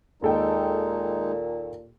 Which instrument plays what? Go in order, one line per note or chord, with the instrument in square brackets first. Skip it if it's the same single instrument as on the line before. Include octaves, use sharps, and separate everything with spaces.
[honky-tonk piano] D#2 A4 G5 [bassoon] A#2 [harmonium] G#3 D#4